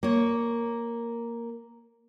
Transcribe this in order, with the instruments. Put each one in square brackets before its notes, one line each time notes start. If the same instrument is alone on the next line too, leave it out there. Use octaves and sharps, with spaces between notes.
[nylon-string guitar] A#3 C#5